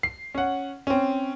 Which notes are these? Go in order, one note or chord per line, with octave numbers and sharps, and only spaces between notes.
C7
C#4 F#5
C4 C#4